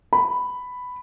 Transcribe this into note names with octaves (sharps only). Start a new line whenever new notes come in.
B5